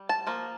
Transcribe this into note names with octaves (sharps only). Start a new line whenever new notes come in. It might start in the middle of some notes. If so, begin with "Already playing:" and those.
Already playing: G3
A5
F3 A#3